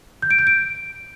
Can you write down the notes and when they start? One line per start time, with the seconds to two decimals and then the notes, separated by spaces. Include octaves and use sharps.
0.22 G6
0.31 D7
0.39 G6
0.47 D7